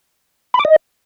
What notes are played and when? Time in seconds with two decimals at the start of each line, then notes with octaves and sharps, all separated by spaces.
0.54 B5
0.59 D6
0.65 D#5